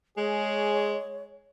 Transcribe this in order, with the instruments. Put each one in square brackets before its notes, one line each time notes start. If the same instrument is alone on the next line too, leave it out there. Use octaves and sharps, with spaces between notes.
[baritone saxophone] G#3 [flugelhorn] G#4 [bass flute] C#5